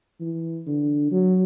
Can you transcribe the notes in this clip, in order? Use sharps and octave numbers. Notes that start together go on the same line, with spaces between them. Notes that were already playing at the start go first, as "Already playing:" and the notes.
E3
D3
F#3